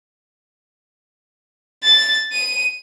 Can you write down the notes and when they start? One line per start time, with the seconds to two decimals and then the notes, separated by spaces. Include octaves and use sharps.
1.83 A6
2.32 D#7